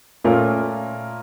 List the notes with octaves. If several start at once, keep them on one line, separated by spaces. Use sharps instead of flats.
A#2 A3 C#4 F4 A#4